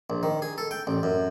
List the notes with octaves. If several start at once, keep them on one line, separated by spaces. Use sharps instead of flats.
A#1
D#3
G#4
A4
G5
A1
F#2